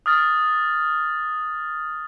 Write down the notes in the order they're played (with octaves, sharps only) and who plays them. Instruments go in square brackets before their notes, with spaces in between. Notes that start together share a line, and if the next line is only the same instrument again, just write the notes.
[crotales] D#6 F6 A6